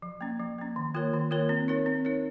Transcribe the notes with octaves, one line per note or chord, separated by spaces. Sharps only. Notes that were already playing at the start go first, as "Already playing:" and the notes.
F3
A#3 C#4
F3
A#3 C#4
D#3
A#3 F4 A#4 C#5
D#3
A#3 F4 A#4 C#5
C4
D#4 A#4 C#5
C4
D#4 A#4 C#5